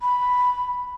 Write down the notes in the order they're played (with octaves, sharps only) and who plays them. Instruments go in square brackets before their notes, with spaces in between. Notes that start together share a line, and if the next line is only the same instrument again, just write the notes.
[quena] B5